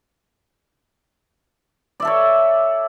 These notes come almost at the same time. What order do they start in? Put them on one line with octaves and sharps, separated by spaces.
D5 E5 A4 C#5